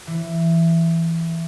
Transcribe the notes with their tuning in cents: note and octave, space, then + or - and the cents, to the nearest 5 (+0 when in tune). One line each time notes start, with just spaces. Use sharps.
E3 +10 C#5 -25